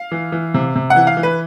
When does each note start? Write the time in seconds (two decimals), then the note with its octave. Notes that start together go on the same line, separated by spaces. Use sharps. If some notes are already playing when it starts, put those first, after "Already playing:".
Already playing: F5
0.11 E3
0.32 E3
0.54 C3
0.76 C3
0.90 F#5
0.96 E3
1.07 F5
1.17 E3
1.23 B4